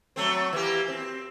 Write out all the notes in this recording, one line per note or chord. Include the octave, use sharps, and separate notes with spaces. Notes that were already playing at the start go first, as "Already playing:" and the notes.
F#3 A3 C4
E3 A#3 G4
C4